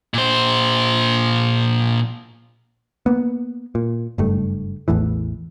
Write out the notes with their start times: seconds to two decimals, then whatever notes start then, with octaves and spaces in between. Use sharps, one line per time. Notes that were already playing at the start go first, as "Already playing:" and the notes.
0.14 A#2 C5
3.06 A#3 B3
3.75 A#2
4.18 F#1 G2 A3
4.88 A1 E2 A2 E3